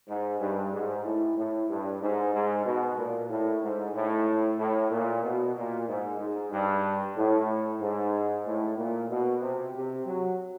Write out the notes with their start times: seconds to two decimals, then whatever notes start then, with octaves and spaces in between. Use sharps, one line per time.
0.08 G#2
0.40 G2
0.73 G#2
1.05 A2
1.38 A2
1.69 G2
2.02 G#2
2.34 G#2
2.66 B2
2.98 A#2
3.30 A2
3.63 G#2
3.95 A2
4.58 A2
4.91 A#2
5.23 B2
5.56 A#2
5.88 G#2
6.20 G#2
6.52 G2
7.17 A2
7.81 G#2
8.46 A2
8.77 A#2
9.09 B2
9.42 C3
9.74 C3
10.06 F#3